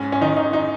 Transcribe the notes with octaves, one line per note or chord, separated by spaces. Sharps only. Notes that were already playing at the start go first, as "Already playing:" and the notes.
Already playing: G#2 C#4
C#4
D#3 D#4
D#4
D#4